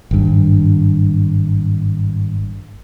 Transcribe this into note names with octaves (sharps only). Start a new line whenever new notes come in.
G#1 G2